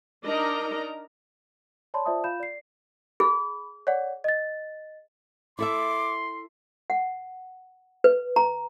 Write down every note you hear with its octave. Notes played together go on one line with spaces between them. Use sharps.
D4 D#4 A#4 D5 D#5 A#5
C#5 D5 A5 B5 C6
F4 C5 D5 E5 A5 D#6
F4 F5 B5 G6 E7
D5 C7
G#4 B5
C#5 D5 F#5
D#5 A6
E4 A4 E5 C6 D6
F#5
B4
A#5